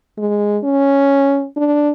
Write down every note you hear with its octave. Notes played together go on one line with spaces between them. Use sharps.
G#3
C#4
D4